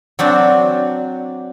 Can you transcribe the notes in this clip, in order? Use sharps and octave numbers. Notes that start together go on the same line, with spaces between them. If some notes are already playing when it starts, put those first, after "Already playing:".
F#3 C4 D4